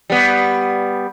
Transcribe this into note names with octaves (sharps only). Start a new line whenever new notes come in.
G3 B3